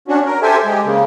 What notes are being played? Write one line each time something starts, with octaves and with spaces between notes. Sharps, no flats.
C#4 D4 F#4
A#4
G4 A4 C5 E5 G#5
G#3 G4
C#3 A#3